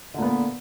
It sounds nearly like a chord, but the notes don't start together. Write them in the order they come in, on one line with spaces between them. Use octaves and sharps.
D3 A#2 B3